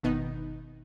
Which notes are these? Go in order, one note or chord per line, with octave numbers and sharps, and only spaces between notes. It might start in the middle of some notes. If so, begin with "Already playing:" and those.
G1 B2 D#3 B3 D#4